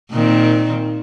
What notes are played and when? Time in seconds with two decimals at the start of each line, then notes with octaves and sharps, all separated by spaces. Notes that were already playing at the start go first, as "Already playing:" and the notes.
0.11 A#2 D#3 C4